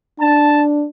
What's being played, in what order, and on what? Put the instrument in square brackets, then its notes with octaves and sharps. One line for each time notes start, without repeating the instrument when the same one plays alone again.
[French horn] D4 [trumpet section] A5